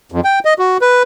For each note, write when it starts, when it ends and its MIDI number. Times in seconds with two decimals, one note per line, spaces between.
0.12 0.20 41
0.24 0.39 79
0.45 0.54 75
0.59 0.78 66
0.81 1.03 71